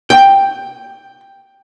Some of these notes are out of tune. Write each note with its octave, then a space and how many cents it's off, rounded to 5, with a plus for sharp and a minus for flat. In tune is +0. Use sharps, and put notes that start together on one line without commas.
G5 +5